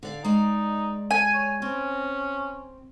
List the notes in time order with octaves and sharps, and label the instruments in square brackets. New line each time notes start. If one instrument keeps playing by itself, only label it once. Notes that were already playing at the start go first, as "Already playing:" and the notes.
[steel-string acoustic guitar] D3 D5 F5
[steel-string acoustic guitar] G#3 D5 [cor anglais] D#4
[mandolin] G#5
[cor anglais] C#5
[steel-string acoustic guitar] C4 [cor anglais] C#4